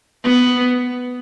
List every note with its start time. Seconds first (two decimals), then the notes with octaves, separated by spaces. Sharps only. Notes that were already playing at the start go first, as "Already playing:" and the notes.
0.24 B3